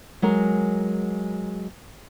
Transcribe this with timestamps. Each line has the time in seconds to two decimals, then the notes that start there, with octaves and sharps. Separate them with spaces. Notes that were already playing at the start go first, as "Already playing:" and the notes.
0.22 F#3 G#3 A#4